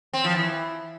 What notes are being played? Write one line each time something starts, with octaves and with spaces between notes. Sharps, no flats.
C4
F3
E3